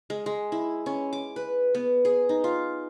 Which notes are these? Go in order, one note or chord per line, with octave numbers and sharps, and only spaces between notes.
G#3
G#3
E4
C#4
D6
B4
B3
G#4
D#4
F4